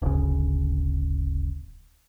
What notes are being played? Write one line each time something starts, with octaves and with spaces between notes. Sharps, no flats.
D1 G1 D2 C#3